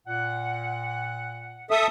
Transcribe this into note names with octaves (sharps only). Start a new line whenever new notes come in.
A#2 F#5
A4 E5 D#6